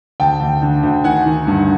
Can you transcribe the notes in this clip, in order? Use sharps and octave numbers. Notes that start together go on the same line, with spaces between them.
D2 G5 A5
D2
D3
D2
D#3 F#5 G#5
D#3
G2